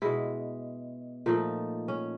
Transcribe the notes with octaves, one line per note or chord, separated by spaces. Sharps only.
B2 G#3 E4
A#2 F3 A3 D#4
C#4